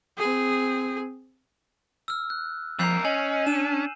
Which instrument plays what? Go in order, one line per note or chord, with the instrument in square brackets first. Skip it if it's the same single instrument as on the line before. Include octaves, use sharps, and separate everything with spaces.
[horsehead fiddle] C4 G#4
[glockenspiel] E6 F6
F#6
[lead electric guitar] F2 A#4 [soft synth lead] F3 [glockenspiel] E6 G6 C7
[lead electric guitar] C#4 [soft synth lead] D#5 [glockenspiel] G#5 F#7
[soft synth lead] D4 [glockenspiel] D#7 E7